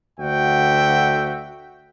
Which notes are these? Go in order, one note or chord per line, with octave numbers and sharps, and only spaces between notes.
D2 D3 F#4 E5 G5